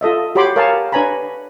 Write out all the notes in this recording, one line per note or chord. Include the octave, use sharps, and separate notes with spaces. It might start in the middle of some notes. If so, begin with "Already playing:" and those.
F4 A4 D#5 E5
F#4 G4 C#5 B5 C6 D6
A#4 C#5 F5 G#5 A5
D4 B4 C#5 G#5 A#5 B5